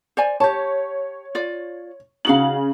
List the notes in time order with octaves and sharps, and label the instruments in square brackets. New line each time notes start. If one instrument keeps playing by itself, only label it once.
[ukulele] C5 D5 G#5
[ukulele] G4 A5 [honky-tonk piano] C#5
[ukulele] F4 D5
[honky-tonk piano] C#3 F#7 [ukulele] D#4 F#4 F5